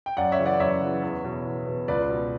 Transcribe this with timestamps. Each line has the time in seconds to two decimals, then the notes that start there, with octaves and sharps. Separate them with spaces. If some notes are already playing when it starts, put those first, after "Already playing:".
0.06 G5
0.17 F#2 D5 F#5
0.32 C#5 E5
0.39 C#3 E3
0.45 D5 F#5
0.60 F#2 C#5 E5
0.81 C#3 E3
1.02 E2
1.25 B2
1.45 E2
1.66 B2
1.88 C#2 B4 D5
2.09 B2